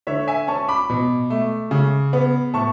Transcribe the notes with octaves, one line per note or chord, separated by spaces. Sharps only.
D3 C#5 E5
E5 G#5
C#4 A5 C#6
B5 D6
B2
A3
C#3
B3
A2 A5 C#6